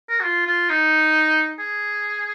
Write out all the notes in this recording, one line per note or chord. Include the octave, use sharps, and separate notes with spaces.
A#4
F#4
F4
F4
D#4
G#4